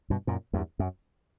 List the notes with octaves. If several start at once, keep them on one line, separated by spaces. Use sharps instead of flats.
G2 B2
F#2 A#2
E2 G2
F#2